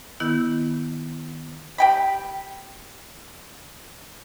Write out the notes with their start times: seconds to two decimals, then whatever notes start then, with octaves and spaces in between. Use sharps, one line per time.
0.20 D#3 B3 E4 G6
1.78 G4 G5 B5